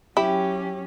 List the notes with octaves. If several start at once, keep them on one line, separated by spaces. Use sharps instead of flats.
F#3 C#4 E4 G4